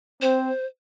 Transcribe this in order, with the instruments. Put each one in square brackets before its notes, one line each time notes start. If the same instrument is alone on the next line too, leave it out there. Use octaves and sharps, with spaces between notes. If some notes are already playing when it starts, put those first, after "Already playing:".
[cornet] C4 [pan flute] C5